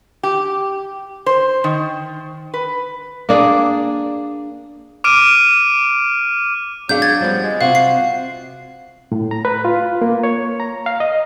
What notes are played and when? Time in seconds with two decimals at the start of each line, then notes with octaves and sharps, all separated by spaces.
0.23 G4
1.26 C5
1.64 D#3
2.54 B4
3.29 A#3 D4 G#4
5.04 D6 F6 D7 D#7
6.89 F#3 D4 G#4 F5 G6
7.02 G#6 A6
7.21 F3 G3 B3
7.44 G#3
7.61 C3 C4 F4 F#4 F5
7.75 C7
9.12 A2
9.31 A#5
9.45 B4
9.65 F4
10.02 A#3
10.23 C#5
10.60 A#5
10.86 F5
11.00 D#5